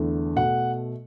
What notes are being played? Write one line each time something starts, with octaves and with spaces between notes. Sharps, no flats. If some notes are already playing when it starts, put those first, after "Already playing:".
Already playing: E2 D3 A3
B2 A3 F#5